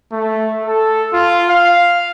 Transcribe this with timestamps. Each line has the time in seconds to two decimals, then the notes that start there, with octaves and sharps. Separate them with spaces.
0.12 A3
0.66 A4
1.13 F4
1.50 F5